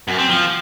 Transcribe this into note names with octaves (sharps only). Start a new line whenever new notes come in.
F#2
C4
F3